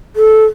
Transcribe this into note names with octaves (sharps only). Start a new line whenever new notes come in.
A4